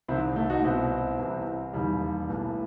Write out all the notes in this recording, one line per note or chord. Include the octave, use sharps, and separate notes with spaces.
C2 C3 D#3 C4 E4
A3
D#4 F#4
C2 B2 C4 E4
C2 C3 E3
E1 D#2 D#3 G3
B1 A2 E3